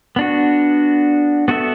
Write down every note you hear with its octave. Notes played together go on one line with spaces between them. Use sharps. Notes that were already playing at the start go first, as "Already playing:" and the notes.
B3 D4 F#4
B3 F#4 A4 E5